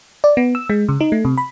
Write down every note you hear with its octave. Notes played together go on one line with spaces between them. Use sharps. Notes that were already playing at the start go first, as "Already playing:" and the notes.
D5
B3
E6
G#3
C#3
D#4
A3
C3
B5